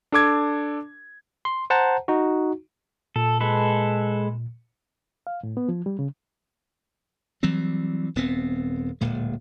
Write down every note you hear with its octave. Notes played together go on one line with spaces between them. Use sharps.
D4 A4 D6 G#6
C6
C5 F#5 A5 A#5
D#4 F#4
A#2 A4
G#3 A4 B4
F5
A2
B3
F3
G3
C#3
E3 F#3 G3 C4
D#1 B3 C4
D1 A#2 G#3